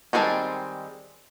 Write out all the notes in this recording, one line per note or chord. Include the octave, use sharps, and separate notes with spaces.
D#3 G3 G#3 C4 A5